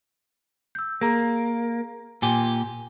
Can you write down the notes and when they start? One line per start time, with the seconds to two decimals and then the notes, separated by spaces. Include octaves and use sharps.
0.75 E6 G6
1.01 A#3 G#4 A#5
2.22 A#2 G4 G#5